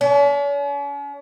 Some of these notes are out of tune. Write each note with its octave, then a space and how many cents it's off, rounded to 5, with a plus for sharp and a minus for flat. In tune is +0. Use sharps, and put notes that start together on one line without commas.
C#4 +45